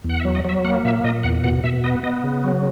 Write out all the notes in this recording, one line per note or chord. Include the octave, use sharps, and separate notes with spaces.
E2 F#5
E5
F#3
D#5
F#3 E5
A#3 F#5
A#2 E5
A#2 D#5
E2 F#5
B2 F#5
B2 E5
B3 D#5
B3 D#5
C#3
F#3